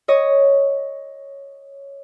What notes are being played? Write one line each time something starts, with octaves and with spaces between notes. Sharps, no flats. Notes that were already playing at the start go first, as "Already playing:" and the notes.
C#5 D#5 D#6